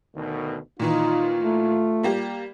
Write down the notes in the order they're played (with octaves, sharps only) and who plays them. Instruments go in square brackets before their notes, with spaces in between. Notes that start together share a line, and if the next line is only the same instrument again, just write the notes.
[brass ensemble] D2 B2 D#3
[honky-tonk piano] A#2 D#3 E3 [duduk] D#4 [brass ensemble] F4
[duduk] A3
[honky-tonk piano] G3 A#3 G4